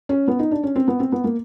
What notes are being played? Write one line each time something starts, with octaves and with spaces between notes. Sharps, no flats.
C#4
B3
D#4
D4
C#4
C4
B3
C4
B3
A#3